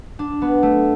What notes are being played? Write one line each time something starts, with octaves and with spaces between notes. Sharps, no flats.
D4
B3
A3